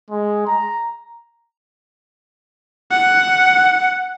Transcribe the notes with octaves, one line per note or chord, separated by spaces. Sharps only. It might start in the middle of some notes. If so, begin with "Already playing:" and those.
G#3
A#5
F#5